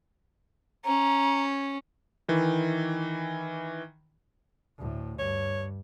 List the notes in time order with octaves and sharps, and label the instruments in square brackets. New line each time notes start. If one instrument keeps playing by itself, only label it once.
[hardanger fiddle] C#4 [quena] A#5
[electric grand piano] D#3 E3
[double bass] D2 A2
[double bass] G2 [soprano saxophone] C#5